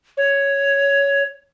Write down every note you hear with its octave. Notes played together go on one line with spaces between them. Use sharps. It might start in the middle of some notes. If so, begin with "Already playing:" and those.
C#5